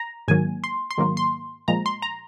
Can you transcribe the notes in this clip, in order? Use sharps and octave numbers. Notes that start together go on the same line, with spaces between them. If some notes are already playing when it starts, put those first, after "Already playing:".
Already playing: A#5
G#2 D#3 F#3 A#3 G#5
C6
C6
G#2 D#3 F#3 A#3
C6
A#2 F3 G#3 A#5
C6
A#5